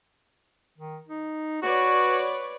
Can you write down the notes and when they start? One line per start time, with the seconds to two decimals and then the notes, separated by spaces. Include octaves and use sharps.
0.78 D#3
1.08 D#4
1.62 F#4 B4 C#5 D5